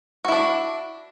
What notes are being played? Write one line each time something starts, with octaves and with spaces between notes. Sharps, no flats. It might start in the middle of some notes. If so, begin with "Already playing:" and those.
D4 E4 F#4